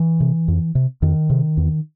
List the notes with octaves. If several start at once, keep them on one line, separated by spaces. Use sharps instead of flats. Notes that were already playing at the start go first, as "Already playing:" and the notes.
Already playing: E3
C3
F2
C3
F2 D#3
C3
E2